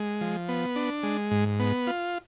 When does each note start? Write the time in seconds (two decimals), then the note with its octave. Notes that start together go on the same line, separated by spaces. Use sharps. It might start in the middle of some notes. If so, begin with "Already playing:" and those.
Already playing: G#3
0.21 F3
0.48 B3
0.76 D4
1.03 G#3
1.31 G#2
1.60 B3
1.87 F4